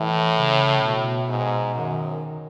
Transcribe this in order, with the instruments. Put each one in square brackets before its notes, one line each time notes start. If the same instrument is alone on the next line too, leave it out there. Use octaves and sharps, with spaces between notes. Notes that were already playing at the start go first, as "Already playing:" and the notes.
Already playing: [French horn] A2 [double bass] E3
[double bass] C#3
B2
[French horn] G#2
[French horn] F#2 [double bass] D#3